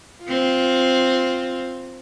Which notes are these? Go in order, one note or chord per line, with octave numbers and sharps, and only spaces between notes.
C4 F4